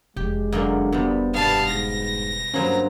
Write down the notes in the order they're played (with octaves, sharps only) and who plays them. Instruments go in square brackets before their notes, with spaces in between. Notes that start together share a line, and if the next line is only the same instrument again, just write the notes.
[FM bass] F1 [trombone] G#3 [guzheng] G4
[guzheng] F#2 D3 A#3
[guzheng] C3 G3 [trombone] B3
[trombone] G2 [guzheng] B2 B3 [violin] F5 A5
[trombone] G#2 [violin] A#6
[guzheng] G2 F#3 A#3 [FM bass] C#4 [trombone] C5